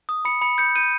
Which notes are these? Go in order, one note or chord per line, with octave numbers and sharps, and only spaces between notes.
D#6
B5 C#7
B5 C#7
G6 C#7
G6 D#7